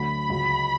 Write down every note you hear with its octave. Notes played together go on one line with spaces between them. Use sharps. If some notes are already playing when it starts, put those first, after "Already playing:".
Already playing: D2 D3 F#3 A3 B5
C#2 C#3 F#3